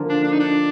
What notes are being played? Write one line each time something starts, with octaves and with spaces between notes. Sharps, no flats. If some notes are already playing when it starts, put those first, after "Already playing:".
Already playing: D3 F3 A#3 F4
D4
D4
D#4
D4